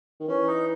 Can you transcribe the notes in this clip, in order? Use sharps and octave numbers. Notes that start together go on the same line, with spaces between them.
D#3
E3 C#4
D#4